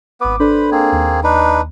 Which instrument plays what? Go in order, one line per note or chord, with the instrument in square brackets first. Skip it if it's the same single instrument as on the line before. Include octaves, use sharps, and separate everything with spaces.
[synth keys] G#1 D6 [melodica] B3 B4
[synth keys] D4 A4 D5 [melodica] B4 C5 B5
[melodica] A#3 C4 G#4
[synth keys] D#2
[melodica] D4 D#4 B4